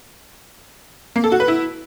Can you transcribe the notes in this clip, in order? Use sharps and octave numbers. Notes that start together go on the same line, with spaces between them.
A#3
A4
F#4
B4
E4